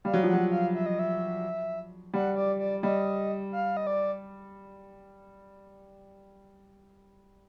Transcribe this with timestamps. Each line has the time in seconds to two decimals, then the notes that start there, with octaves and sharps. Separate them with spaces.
0.04 G3 F5
0.13 F#3
0.23 F3 F#5
0.34 F#3
0.51 F5
0.74 E5
0.86 D#5
0.99 E5
2.13 G3 F#5
2.36 D5
2.59 D5
2.83 G3 D#5
3.52 F5
3.77 D#5
3.87 D5